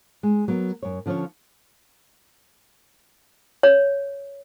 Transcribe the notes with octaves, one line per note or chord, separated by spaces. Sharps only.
G#3
F#3 B3 A#4
F#2 C#5
D3 F3 C#4 F4 C#5
C#5